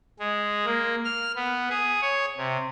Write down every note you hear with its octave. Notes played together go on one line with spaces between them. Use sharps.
G#3
A#3
F6
B3
G#4
C#5
C3